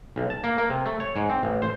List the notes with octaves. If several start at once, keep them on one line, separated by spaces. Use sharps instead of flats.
B1
A5
A#3
A#3
C3
A3
C#5
G#2
C4
A1
C5